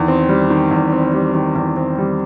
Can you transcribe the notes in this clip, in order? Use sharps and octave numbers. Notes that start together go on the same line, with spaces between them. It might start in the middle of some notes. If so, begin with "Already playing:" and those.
Already playing: E2 D#3
C4
G3
D#3
E2
C4
G3
D#3
E2
C4
G3